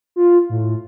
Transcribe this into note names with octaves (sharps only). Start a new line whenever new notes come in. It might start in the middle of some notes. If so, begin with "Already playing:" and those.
F4
A2